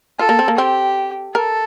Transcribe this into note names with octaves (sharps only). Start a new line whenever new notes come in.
F4 A4
A#3
C4
A#3
C4 G4
A4 A#4